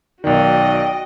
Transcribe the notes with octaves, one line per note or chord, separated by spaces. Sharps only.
B1 D#3 F#4 D5 D#5 G5